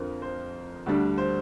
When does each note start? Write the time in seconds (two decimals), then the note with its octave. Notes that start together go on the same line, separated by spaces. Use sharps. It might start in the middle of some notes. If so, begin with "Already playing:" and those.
Already playing: F2 D3 F3 C4 A#4
0.22 C5
0.86 D2 D3 G3 D4
1.18 C5